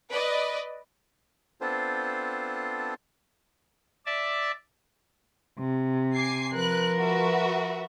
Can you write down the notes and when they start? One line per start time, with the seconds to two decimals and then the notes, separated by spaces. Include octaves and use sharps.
0.10 B4 D5 D#5
1.61 B3 C4 D4 F4 A4 C5
4.06 D5 E5 A5
5.59 C3
6.15 G#5 D6 C7
6.54 F3 A#4 B4 F#6
6.98 F#4 B4 E5